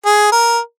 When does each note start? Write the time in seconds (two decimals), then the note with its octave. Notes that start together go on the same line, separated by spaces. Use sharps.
0.06 G#4
0.32 A#4